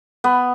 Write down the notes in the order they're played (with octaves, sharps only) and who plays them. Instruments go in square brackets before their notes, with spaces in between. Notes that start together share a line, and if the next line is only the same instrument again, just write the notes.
[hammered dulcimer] B3